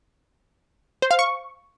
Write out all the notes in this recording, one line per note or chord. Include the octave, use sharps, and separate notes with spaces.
C5
F5
C#6